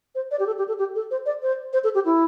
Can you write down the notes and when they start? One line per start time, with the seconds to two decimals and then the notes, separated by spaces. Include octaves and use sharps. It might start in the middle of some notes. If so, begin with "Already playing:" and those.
0.15 C5
0.31 D5
0.39 G4
0.47 A4
0.58 G4
0.68 A4
0.79 G4
0.95 A4
1.11 C5
1.26 D5
1.42 C5
1.73 C5
1.84 A4
1.95 G4
2.05 E4